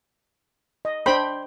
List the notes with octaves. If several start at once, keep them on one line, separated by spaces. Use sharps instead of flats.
D#5
D4 C5 G5 B5